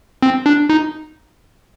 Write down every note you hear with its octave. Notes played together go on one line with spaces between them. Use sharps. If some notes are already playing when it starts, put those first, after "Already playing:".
C4
D4
D#4